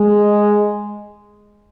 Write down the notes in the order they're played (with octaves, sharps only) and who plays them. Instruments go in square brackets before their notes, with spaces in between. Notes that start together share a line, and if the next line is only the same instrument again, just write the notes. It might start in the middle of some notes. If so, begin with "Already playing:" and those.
Already playing: [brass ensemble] G#3